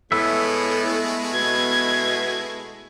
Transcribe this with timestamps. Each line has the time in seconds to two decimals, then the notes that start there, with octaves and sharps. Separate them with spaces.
0.12 A2 G#3 A3 B3 E4 B4 E5
1.33 B2 G#6